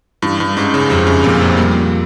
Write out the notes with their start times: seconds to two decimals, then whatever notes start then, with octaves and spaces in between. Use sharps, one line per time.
0.22 G2 E3
0.40 G2
0.57 G#2 C#4
0.74 C#3
0.90 F2 C3
1.07 C#3
1.24 F2 A#2
1.41 C3
1.57 G3 A#3